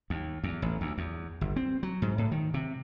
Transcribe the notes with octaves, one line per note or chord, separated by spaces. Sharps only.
D#2
E2
A1
D2
E2
G1
C4
F#3
G#2
A2
D#3
C3